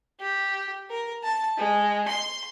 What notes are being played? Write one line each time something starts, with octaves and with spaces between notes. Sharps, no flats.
G4
A#4
A5
G#3
C6